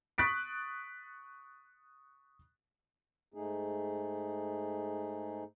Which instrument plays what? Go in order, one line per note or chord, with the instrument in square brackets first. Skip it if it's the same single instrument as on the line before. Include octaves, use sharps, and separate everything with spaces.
[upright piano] C#6 D#6 F#6 A6 B6 D7
[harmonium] G#2 A3 D#4 G#4